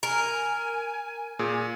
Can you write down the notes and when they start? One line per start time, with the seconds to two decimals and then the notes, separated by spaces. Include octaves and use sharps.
0.03 A#4 G#5
1.39 A#2 G#4